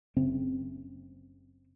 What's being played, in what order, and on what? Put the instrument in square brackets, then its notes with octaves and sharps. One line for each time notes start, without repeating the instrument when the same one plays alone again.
[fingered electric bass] F#1 C#3 C4